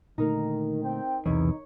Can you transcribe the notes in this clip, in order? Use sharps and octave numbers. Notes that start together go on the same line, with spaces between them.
A#2 D3 D#3 A3 D#4 A#4
C4 G5
B1 E2 C3 D#4 C#5